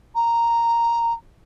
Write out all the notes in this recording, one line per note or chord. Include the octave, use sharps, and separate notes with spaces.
A#5